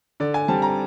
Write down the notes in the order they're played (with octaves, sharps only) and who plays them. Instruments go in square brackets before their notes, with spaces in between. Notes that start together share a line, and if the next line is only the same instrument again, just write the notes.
[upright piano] D3 D5
G#5
G3 C4 A5
A#5